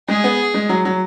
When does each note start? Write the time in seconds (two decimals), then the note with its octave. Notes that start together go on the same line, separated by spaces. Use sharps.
0.08 G#3 G#4
0.24 B3
0.54 G#3
0.69 F#3
0.85 F#3